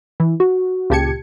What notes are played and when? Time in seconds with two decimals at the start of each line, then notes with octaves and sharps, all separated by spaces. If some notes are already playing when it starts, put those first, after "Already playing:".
0.20 E3
0.40 F#4
0.90 C#2 A#2 G4 A5 G#6 C#7